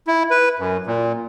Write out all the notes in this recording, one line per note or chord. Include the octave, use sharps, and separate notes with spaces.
E4
B4
F#2
A#2